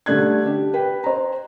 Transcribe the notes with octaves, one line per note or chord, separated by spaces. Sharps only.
D3 G3 A3 D5 F#6 G#6
D4 G4
B4 G5
C5 A#5